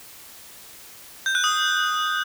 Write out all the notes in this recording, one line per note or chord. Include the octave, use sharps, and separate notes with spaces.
G6
F#6
D#6